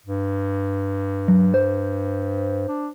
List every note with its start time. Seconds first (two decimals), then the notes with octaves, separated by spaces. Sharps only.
0.06 G2
1.28 F#3
1.54 C5
2.68 D4